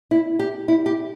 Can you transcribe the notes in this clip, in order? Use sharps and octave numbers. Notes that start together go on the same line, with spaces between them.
E4
G4
E4
G4